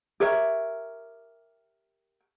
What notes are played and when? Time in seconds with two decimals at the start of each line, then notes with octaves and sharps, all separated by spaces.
0.20 G4 A#4 C#5 E5